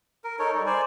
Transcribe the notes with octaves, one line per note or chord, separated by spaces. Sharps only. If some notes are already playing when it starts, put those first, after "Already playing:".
A#4
D#4 A4 A#4 C#5
G3 D#4
C5 D5 G#5